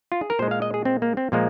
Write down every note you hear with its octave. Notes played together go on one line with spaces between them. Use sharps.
F4
G#4
A#4
A#2 G#3 C5
F5
D#5
G#4
C4
A#3
C4
A#2 F3 G#3 A#3